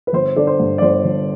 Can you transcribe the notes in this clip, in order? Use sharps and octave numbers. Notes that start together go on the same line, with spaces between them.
B4
G1 C5
D3 D5
C5
G2
D5
G1 C5
G1